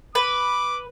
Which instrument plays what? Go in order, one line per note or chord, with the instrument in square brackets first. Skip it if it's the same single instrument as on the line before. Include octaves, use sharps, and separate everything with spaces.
[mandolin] B4 [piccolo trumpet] D6